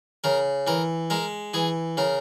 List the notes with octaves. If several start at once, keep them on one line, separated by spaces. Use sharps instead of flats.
C#3 A#4
E3 A#4
G#3 A#4
E3 G#4
C#3 A#4